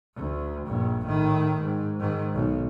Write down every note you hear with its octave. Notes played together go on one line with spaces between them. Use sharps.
D2
A#1 G2
A2 D#3
G#2
G#2 D#3
B1